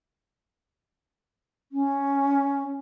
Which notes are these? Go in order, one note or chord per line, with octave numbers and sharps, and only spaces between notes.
C#4